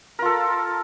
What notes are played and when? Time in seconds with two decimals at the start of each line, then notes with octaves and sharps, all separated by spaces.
0.19 A#4
0.22 F4
0.25 A4